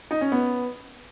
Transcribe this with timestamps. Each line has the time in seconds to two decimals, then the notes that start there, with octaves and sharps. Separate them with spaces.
0.11 D#4
0.21 C#4
0.32 B3